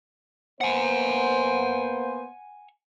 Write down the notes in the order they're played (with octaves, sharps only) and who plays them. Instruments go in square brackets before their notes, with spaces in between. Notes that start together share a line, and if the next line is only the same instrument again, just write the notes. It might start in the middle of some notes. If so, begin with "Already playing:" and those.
[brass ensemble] A#3 B3 C5 [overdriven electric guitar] F#5 G#5